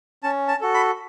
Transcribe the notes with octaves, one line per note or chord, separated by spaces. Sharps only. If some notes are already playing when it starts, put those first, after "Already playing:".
C#4 A5
A5
F#4 A4
B5